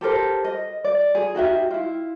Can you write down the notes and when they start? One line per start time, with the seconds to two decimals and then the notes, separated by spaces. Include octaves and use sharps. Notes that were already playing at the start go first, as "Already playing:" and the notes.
0.01 G4 A4 A#4 C5
0.45 D#5
0.85 D5
1.15 G#4
1.35 D#4 F#4 G4 E5
1.71 E4 F4